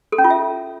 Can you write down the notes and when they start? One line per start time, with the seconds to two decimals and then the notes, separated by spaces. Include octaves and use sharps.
0.12 A4
0.18 C#4
0.24 F4
0.30 E5